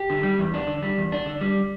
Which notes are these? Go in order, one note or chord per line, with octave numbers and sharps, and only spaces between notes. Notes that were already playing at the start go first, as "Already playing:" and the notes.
Already playing: G4
D3
G3
E2
D4
D3
G3
E2
D4
D3
G3